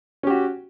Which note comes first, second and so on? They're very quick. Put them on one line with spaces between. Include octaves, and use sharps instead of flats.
C#4 G4 F#4